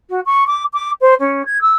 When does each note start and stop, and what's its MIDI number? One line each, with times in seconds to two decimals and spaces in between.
0.09 0.20 66
0.25 0.44 85
0.47 0.63 86
0.73 0.91 86
1.01 1.14 72
1.19 1.45 61
1.45 1.61 92
1.61 1.77 88